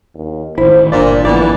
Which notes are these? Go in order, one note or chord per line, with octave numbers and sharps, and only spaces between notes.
D#2
A1 D#3 E4 C5
G1 A#2 D4 D5
G#1 E3 F3 B3 D5